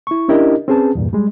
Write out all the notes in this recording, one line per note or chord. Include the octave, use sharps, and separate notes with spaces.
E4 C#6
C#4 D4 E4 G4 A#4 D#5
C4 C#4 G#4 B4 A5
E2 G2 A#2
G3 G#3